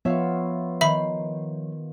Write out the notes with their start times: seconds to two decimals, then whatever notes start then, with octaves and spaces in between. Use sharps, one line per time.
0.05 F3 B3 F4 C#5 E5 F5 C#6
0.81 D#3 E5 B5 C7